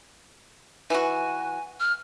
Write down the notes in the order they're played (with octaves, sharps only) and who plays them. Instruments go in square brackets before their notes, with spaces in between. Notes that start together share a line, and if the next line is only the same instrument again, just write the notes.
[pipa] E3 F#4 [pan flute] G#5
[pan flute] F6